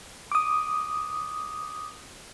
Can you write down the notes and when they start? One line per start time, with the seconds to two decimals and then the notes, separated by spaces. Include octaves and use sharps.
0.32 D6 D#6